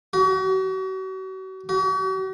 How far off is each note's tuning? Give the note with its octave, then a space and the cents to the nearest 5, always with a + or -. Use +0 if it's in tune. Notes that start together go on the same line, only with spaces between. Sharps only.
F#4 +40
F#4 +45